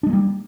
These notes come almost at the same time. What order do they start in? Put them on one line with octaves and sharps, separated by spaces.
D4 G#3 A#3 G3